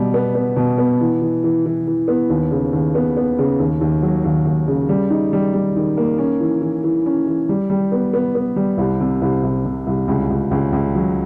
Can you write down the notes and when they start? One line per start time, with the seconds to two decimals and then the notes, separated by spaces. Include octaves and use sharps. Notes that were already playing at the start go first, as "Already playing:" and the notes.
Already playing: B2 G3
0.14 B3
0.35 B3
0.56 B2
0.78 B3
1.01 E3
1.22 E3
1.44 E3
1.66 E3
1.87 E3
2.08 B3
2.30 D#2
2.51 C#3
2.73 D#2
2.95 B3
3.17 B3
3.39 C#3
3.59 D#2
3.81 D#2
4.02 F#3
4.24 D#2
4.46 D#2
4.68 C#3
4.89 G3
5.10 D#4
5.33 G3
5.54 G3
5.76 D#3
5.97 A#3
6.18 C#4
6.41 E3
6.62 E3
6.84 E3
7.06 C#4
7.27 E3
7.49 G3
7.70 G3
7.92 B3
8.14 B3
8.35 B3
8.56 G3
8.78 C2
9.00 C3
9.22 C2
9.43 C2
9.65 C3
9.87 C2
10.08 C#2
10.30 C#2
10.51 C#2
10.73 C#2
10.95 F#3